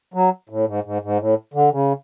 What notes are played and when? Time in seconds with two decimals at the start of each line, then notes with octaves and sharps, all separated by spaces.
0.14 F#3
0.49 A2
0.67 G#2
0.84 G#2
1.02 G#2
1.19 A2
1.54 D3
1.72 C#3